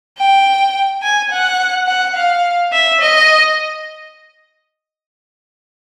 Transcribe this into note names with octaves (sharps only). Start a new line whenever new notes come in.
G5
G#5
F#5
F#5
F5
E5
D#5